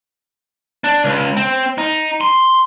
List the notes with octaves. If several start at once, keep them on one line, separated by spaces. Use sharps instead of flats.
D4
C#2
C4
D#4
C6